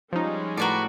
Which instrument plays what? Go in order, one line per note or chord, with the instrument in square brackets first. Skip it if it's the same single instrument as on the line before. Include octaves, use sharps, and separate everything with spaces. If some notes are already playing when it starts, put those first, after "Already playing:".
[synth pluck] F3 D#4 [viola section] G3 G#3 C#4
[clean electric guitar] A2 F#4 [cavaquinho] A#4 B4 D5